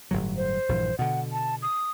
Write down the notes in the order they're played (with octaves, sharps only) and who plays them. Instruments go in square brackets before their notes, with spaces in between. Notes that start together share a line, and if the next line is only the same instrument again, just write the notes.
[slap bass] G1 A2 F#3
[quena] C5
[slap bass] A#1 G2 E3
[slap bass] B2 D3 [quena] F#5
[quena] A5
D#6